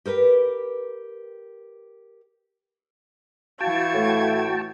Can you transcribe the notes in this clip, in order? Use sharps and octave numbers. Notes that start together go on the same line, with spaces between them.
G4 A#4 B4 G5
E3 F#4 F5 G5 A5 C#6 G#6
A2 A3